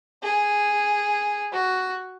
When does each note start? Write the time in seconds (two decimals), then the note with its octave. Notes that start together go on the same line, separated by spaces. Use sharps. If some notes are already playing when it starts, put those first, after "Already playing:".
0.23 G#4
1.53 F#4